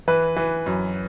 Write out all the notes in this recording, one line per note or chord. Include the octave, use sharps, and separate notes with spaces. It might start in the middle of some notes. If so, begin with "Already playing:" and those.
E3 B4
E3
F#2